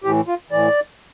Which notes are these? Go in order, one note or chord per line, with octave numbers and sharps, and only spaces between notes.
A2 E3 G4
F4
A2 E3 D5